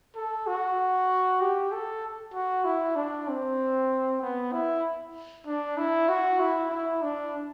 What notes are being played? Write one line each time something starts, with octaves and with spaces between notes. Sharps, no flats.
A4
F#4
G4
A4
F#4
E4
D4
C4
B3
E4
D4
E4
F#4
E4
E4
D4